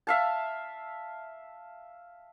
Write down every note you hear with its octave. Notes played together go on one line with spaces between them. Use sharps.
E5 F5 A5